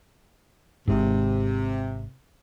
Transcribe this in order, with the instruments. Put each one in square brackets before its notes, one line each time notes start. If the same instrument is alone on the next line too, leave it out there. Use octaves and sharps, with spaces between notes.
[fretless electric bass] G#1 G#2 [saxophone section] C3